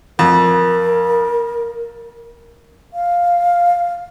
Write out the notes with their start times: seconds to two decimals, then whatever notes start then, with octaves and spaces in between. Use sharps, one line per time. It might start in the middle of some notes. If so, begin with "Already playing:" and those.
0.19 F2 A#4
2.93 F5